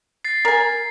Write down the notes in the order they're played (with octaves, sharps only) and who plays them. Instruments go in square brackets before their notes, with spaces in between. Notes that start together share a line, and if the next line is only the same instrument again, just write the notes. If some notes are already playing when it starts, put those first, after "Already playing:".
[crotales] A6 C7
[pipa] A#4 G#5